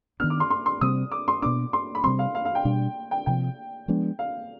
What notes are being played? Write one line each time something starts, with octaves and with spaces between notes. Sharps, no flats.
D#3 B3 D4 F6
D6
C6
C6
C6
C3 G3 C4 D#6
D6
C6
B2 B3 D4 D6
C6
B5
C3 G3 C4 C6
F5
F5
F5
G5
B2 G3 D4
G5
C3 F3 C4 G5
F3 G#3 B3 D4
F5